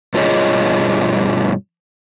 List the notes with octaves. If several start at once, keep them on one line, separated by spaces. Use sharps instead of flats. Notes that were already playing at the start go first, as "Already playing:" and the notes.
G2 B2 F4 G#4 C#5 D#5